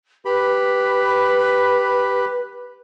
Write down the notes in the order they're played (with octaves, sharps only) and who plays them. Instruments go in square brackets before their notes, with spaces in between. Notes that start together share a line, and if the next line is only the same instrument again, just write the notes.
[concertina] G4 B5 [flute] B4